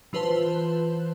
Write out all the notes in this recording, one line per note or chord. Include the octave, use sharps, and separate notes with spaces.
E3 F4 B4 C5 A5 C6